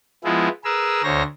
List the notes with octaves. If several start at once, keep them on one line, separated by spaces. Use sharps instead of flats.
F3 G#3 B3 E4
G#4 A#4 B4 E6
D2 C5 C#5 A#6